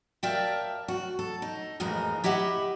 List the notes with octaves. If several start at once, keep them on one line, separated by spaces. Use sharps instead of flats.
A#4 D5 E5 F5 G5 A5
F#4
A4
D#4
F2 A2 E3 G#3 D#4 A#4
E4 G4 D#5 E5 F#5